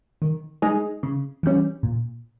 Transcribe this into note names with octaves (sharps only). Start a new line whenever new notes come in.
D#3
G#3 D#4 G#4 D#5
C#3
E3 G3 C#4
A#2